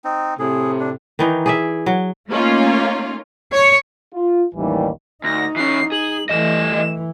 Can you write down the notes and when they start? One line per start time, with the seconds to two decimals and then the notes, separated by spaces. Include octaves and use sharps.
0.04 C4 D#4
0.39 A2 C3 G#4
0.80 D4
1.19 D#3 E3 D#4
1.46 G#4 D5 E5
1.86 F#3
2.29 A3 A#3 C#4 D#4 F4
3.54 C#5
4.14 F4
4.55 A1 D#2 D#3 E3 G3
5.24 D2 D#4 A#6
5.56 E3 C#4 C7
5.92 G#4 F#7
6.29 E3 G3 A3 D#5 E7
6.73 E3